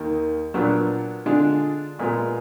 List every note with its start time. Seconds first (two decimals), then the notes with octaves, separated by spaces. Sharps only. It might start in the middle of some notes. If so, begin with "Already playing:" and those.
Already playing: D#2 D#3 A#3
0.54 A#2 F#3 B3 D4 F4
1.26 D3 G#3 D4 F4
1.99 A#2 G#3 B3 F4